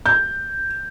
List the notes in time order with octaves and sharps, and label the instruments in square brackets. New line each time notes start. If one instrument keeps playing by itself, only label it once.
[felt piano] G6